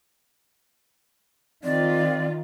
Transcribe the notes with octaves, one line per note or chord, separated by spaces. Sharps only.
D#3 C4 F4 D5